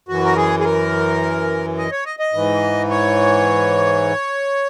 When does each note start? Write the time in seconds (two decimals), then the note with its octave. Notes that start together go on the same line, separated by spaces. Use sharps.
0.09 F#2 E3 F#4
0.25 A#4
0.36 G#4
0.60 G#4
0.65 A#4
1.78 D#5
1.92 C#5
2.06 D#5
2.20 D#5
2.33 G#2 E3
2.90 C#5